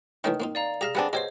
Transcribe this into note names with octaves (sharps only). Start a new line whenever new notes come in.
D#3 E3 A3 C#4
A#3 C4 D#4
D5 F5 A#5
G4 G#4 E5 F5 A#6 E7
G3 B3 C4 D4 F#5 G#5
B2 G4 C5 C#5 D#5 G5 C6